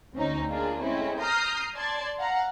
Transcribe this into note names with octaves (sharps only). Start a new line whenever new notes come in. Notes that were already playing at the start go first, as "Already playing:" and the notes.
D2 C4 C#4 D#4
A#3 D4 F4 G#4
G#3 A3 C4 C#4 E4
A#5 D#6 F6 G6 A#6 C7
D5 A5 C6 G#6
F5 F#5 A#5